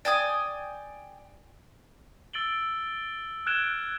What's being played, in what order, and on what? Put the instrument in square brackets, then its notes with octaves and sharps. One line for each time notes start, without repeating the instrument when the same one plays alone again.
[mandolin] D5 G5 G#5 D#6
[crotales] E6 A6 D7 F#7 G7
F6 F#6 G#6 D7 E7 G7